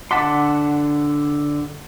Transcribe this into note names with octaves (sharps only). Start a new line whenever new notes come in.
D3 F#5 A5 C6 D6 B6